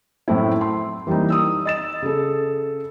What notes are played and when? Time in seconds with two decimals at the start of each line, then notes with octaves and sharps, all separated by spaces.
0.28 F#2 A2 A3 C4 E4
0.61 C6
1.07 E3 G3 A#3 C4 D#4
1.30 D#6 E6
1.65 D#5 A6 E7
2.02 C#3 A4